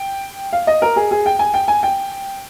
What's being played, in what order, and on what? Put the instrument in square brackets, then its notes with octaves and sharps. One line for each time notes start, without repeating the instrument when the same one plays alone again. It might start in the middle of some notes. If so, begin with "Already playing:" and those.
Already playing: [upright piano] G5
F5
D#5
A#4
G#4
G#4
G5
G#5
G5
G#5
G5